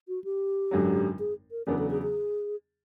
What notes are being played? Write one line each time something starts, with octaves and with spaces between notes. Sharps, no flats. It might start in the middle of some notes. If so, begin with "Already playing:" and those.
F#4
G4
G#1 F#2 D3 F#3
G#4
A#4
E2 C#3 F#3 B3 D4 A#4
A4
G#4
G#4